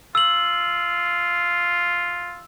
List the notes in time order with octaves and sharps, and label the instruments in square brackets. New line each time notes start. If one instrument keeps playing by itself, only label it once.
[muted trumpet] F4 [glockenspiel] E6 F#7